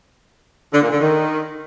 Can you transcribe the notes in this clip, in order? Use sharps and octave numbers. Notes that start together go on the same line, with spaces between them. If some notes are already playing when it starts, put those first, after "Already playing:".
D3
A#2
D3
D#3